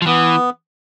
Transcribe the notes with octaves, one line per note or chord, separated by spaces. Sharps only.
F3
E3 B3